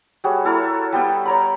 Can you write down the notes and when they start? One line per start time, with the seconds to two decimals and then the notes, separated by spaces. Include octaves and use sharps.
0.24 G3 F#4 G#4 C#5
0.45 E4 A4 A#4 C#5
0.93 G3 B3 G5 D#6
1.26 C#5 A#5 B5